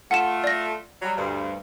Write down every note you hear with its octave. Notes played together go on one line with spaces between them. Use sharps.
A3 F4 F#5 E7
D5 A#6
F#3 G3
D2 G2